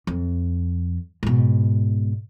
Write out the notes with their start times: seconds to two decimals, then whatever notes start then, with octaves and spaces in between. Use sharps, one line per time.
0.07 F2
1.23 G#2 B2